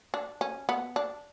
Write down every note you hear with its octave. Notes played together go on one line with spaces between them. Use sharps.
D4
C#4
B3
D4